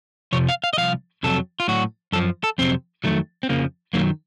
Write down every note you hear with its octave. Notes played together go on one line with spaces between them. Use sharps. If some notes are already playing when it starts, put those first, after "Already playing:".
F2 C3 F3 C#5
F5
F5
D#5
C2 A#2 F3 F5
F2 C3 D#3 F#3 A4
F4
A2 F#3 F#4
F#2 F3 A4
A4
F2 C3 F#3 C4
F2 D#3 F#3 A3
C4
F2 C#3 F3 A#3
F#2 D#3 F#3 A#3